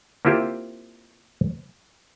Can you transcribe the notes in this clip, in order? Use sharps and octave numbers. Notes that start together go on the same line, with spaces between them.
A#3 C4 E4 F4 G4 C5